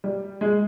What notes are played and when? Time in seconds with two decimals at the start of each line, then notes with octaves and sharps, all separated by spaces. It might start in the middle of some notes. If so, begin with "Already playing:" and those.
0.04 G3
0.41 G#3